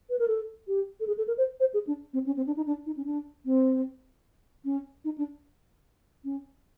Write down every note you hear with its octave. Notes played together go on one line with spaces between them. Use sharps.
B4
A#4
A4
G4
A4
G#4
A4
A#4
C5
C5
G#4
D4
C4
C#4
C4
D4
D#4
D4
D#4
C#4
D4
C4
C#4
D#4
D4
C#4